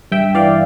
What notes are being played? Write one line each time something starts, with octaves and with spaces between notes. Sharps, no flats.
G2 E5 G5
E3 D5 F5